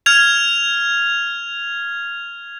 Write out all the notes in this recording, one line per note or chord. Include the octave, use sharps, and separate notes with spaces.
F6 G#6 F7